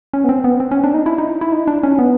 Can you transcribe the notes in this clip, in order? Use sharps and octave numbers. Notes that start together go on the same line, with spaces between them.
C#4
B3
C4
B3
C4
C#4
D4
D#4
E4
D#4
E4
D#4
D4
C#4
B3